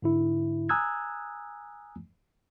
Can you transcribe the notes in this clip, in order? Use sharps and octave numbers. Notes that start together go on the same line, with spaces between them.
G#2 D3 E4
G#5 A#5 D#6 E6 F#6 G#6